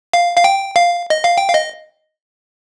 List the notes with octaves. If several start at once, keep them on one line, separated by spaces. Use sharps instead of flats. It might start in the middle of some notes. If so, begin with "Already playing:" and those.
F5
F5
G5
F5
D#5
F5
G5
F5
D#5